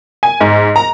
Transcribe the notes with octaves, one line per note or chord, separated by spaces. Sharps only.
G#5
G#2
A#5